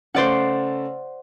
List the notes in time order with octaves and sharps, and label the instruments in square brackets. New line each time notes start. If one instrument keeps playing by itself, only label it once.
[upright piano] C#3 A3 [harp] C5 D5 F#5